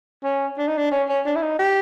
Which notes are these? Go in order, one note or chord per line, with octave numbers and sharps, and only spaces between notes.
C#4
D4
D#4
D4
C#4
C#4
D4
E4
D#4
G4